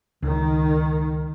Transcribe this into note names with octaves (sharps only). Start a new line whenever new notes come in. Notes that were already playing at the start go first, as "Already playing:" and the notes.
C#2 D#3